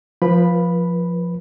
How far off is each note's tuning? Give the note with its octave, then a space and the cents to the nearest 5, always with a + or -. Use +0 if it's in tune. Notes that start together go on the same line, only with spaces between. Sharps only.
F3 +0 B4 -30 B5 +0